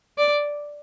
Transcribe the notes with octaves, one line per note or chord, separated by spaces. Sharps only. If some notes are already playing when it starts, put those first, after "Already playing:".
D5